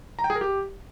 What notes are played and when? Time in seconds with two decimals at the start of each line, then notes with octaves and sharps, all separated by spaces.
0.19 A#5
0.24 G5
0.30 G#4
0.35 A#4
0.41 G4